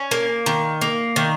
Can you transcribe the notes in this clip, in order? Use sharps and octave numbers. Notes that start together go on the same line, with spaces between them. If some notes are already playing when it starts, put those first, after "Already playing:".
Already playing: C#4
A#3
D#3
A#3
D#3